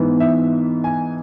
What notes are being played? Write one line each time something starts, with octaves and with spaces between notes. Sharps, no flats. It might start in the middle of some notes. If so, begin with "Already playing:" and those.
Already playing: G#2 E3 B3
E5
G#5